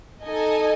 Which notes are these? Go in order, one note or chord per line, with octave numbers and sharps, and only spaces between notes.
D#4 A4 D#5 G#5